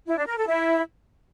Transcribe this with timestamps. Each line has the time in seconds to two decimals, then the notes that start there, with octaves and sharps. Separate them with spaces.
0.07 E4
0.17 D4
0.27 A#4
0.37 A4
0.47 E4